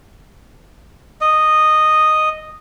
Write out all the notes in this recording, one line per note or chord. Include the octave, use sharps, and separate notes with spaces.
D#5